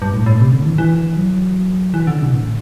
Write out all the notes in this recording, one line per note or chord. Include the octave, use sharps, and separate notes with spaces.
G2
A2
A2
C3
D3
E3
E3
F#3
E3
D3
C3
A2